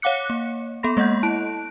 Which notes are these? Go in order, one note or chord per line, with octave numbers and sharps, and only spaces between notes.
C#5 F5 F#5 D6 F#6 C#7
A#3
B3 A4 B5 C6 A#6
G#3 A#3 D#5 F#5 G6
E4 A5 F#6 D7